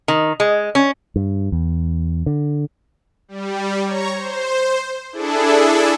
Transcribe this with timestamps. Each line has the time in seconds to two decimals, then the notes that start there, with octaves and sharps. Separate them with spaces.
0.08 D#3
0.40 G#3
0.75 C#4
1.16 G2
1.52 E2
2.26 D3
3.28 G3
3.85 C#5 A#5 C#6
4.14 C5
5.12 D4 E4 G#4 A4